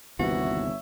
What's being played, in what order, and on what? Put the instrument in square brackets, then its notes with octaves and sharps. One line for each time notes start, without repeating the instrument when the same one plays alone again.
[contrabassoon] G1 [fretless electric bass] D#2 C3 E3 [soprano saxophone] F#4 [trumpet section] C#5 E5